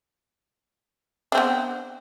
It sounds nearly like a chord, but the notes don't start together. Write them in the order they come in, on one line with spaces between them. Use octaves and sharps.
D4 C4 B3